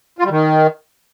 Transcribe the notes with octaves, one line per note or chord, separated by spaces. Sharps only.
F4
G3
D#3